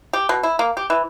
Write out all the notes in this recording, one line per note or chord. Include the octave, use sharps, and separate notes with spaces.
G4
B2
E4
A#3
G4
E3